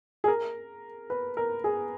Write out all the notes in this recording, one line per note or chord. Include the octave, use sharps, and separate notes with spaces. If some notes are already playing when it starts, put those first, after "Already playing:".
G#4
A#4
B4
A#4
G#4